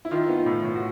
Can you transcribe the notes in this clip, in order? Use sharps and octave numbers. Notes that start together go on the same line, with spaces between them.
E4
D#3 F4
B3
A2
A2
F#4